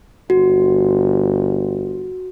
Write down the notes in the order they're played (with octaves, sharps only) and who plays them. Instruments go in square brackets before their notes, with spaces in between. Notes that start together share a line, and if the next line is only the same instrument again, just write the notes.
[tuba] G1 [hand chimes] F#4